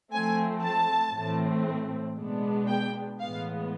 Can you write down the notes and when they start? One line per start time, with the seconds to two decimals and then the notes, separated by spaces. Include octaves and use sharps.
0.12 F3 A3 C4 G#5
0.63 A5
1.14 A2 E3 A3 C4
2.17 B2 G#3 B3 D4
2.68 G5
3.20 A2 E3 G#3 B3 F5